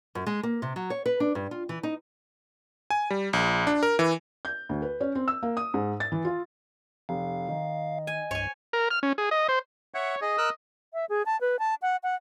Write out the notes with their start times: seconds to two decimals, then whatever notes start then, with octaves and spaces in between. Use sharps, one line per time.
0.15 F#2
0.27 G#3
0.43 A#3
0.62 C3
0.76 F#3
0.90 C#5
1.06 B4
1.20 D4
1.35 G2
1.51 F4
1.69 E3
1.83 D#4
2.90 G#5
3.10 G3
3.33 A#1
3.67 D4
3.83 A#4
3.99 E3
4.45 G6
4.69 D2
4.82 B4
5.01 C#4
5.15 C4
5.28 E6
5.43 A#3
5.57 D#6
5.74 G#2
6.00 A6
6.12 E3
6.25 F4
7.09 F1 F5
7.49 D#3 D#5
8.07 G#5
8.31 C2 G2 C#5 G#5
8.73 A#4
8.91 F6
9.03 C#4
9.18 G#4
9.31 D#5
9.49 C5
9.94 C#5 E5 F#5
10.21 G#4 D#5
10.38 A#4 E6 F#6
10.94 E5
11.09 G#4
11.26 A5
11.41 B4
11.59 A5
11.82 F#5
12.03 F#5